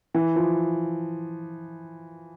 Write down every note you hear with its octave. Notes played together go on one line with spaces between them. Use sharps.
E3
F3